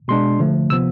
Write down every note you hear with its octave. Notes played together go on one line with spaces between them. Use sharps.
B2 G#3 D4 C6
D3 F3 A3
C3 F3 B3 E6